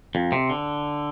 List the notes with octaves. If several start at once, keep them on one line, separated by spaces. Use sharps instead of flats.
F2
C3
D3